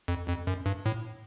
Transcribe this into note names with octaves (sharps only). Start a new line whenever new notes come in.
F2
F2
F#2
G2
A2